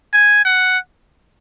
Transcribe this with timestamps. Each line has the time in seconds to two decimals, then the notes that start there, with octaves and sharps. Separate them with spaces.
0.14 G#5
0.45 F#5